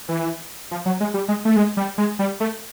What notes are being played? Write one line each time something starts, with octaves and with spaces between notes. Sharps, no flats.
E3
F3
F#3
G#3
G3
G#3
A3
G#3
G3
G#3
G3
A3